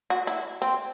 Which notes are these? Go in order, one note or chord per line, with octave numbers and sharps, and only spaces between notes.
F#4
E4
C4